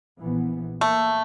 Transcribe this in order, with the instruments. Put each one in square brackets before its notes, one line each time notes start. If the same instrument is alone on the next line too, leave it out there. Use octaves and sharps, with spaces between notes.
[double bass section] A#1 E3 B3
[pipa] A3 [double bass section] A#3